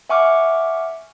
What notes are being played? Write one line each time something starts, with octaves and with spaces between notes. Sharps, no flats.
E5 F#5 G#5 C#6 D6 F6